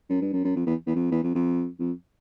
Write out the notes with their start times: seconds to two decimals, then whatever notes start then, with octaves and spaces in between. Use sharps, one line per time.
0.09 F#2
0.21 G2
0.33 F#2
0.44 F#2
0.56 F2
0.66 E2
0.86 E2
0.95 F2
1.11 E2
1.23 F2
1.35 F2
1.79 F2